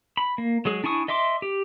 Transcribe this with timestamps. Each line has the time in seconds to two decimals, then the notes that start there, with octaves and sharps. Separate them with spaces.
0.17 B5
0.38 A#3
0.65 F#3 G#3 G#4
0.84 D4 E4 G#5 C#6 D#6
1.08 D#5 E5 C6 D6
1.42 G4